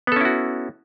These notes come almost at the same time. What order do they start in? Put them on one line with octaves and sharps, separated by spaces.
B3 A4 C#4 E4 F#4